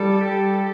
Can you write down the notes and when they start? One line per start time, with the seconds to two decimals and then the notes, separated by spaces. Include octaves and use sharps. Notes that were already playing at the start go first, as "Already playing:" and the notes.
Already playing: G3 A4
0.21 G4